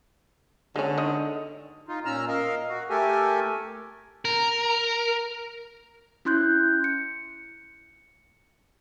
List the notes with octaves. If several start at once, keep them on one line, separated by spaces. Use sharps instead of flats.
D3 G#3 C#4
D#3 D#5
D#4 F4
A#2 C#4 A#5 E6 F6
A#4 D#5 F5
F#4
A3 G4 A4 A#4 G#5
A#4
C#4 E4 C6 F#6 G6
C#7